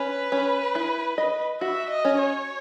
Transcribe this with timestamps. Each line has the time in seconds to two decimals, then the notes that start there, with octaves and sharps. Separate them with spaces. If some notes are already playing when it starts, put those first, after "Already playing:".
Already playing: C#4 B4
0.32 C#4
0.75 E4
1.18 D#5
1.61 F#4 E5
1.90 D#5
2.05 C#4
2.19 C#5